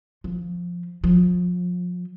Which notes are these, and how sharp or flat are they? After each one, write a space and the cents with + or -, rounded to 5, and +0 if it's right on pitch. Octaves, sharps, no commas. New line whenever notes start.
F3 +5
F3 +35